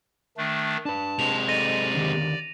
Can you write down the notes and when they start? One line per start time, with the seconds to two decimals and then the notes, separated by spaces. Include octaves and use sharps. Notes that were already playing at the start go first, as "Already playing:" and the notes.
0.37 D#3 A3 D4
0.85 D4 B4 A5
1.19 C3 G#3 F7
1.48 A4 D5 D#5 A#6 D#7
1.95 D3 D#3 G4